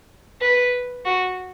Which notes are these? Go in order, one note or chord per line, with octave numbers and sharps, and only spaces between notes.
B4
F#4